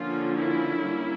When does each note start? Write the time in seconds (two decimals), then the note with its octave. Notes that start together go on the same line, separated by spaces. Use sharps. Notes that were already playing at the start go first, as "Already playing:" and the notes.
Already playing: D3 F3 A#3 C#4 F4
0.37 E4
0.80 G3 A#3 C#4